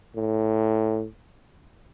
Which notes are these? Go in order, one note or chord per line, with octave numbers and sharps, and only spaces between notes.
A2